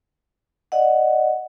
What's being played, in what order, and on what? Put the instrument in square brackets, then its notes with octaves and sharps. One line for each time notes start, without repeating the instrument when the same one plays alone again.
[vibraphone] D5 D#5 F#5